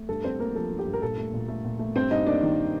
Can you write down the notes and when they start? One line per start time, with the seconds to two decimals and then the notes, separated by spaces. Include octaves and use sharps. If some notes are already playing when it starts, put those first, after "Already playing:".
Already playing: A3
0.09 G2 A4
0.24 G2 C4 C5
0.39 A3 A#3 A#4
0.55 F3 A4
0.71 G2
0.79 G4
0.87 G2
0.93 A#4
1.02 A#2 A4
1.18 A3
1.33 A#2
1.48 A3
1.64 A#2
1.79 A3
1.95 G2 C4 C5
2.11 G2 D#4 D#5
2.26 A#3 D4 D5
2.42 D#3